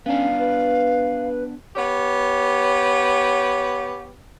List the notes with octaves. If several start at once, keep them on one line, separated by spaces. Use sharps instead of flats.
B3 C#4 D4 F5
B4
B3 G4 C#5